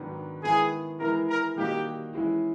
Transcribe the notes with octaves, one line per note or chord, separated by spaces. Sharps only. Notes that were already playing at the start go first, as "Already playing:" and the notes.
Already playing: G#2 D#3 F#3 B3 D4
D#3 G#3 B3 E4 G#4
E3 G#3 B3 E4 A#4
A#4
D#3 G3 A#3 D#4 F#4 G4
E3 G#3 C#4 E4